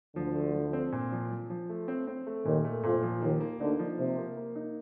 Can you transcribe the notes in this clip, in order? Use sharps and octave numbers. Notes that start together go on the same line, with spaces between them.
D2 D3 F3
A3
F3
C4
A#2
F3
F3
F3
A3
C4
C4
A3
D#2 A#2 D#3
A3
F2 A#2 F3
F3
D#2 D#3 A#3
A#3
D2 D3 D#4
F3
C3 A#3
A#3
A#3
D#4